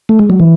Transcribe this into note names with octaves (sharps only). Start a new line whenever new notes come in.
A3
G#3
F#3
E3